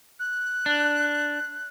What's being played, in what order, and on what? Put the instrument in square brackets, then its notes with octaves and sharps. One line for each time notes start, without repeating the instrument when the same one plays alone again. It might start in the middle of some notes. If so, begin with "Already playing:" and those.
[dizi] F#6
[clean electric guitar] D4